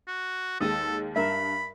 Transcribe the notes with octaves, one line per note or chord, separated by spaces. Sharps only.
F#4
D#2 G#3 A4 D#6
G2 A#4 E5 B5